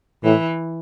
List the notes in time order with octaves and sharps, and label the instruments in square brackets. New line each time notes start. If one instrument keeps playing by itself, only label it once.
[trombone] A2 [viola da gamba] E3